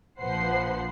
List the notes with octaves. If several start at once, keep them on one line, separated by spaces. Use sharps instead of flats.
A#1 F3 B4 C5 F#5 C7